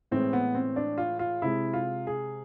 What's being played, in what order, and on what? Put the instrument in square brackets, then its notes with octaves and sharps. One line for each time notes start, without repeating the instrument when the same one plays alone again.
[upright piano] A2 E3 G#3 C4
B3
C4
D4
F4
F4
C3 G#3 E4
F4
G#4